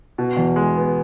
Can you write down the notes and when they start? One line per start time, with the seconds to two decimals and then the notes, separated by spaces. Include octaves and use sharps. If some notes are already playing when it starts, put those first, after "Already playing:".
0.18 B2
0.37 E2
0.56 G#3
0.76 B3